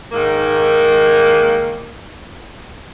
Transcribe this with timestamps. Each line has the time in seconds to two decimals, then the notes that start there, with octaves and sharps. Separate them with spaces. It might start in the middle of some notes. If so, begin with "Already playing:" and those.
0.11 G#2 D#3 A#3